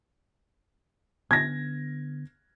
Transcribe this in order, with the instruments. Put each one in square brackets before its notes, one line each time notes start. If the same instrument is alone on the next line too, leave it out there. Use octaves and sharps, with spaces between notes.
[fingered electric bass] D3 B3 [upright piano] G#6 A#6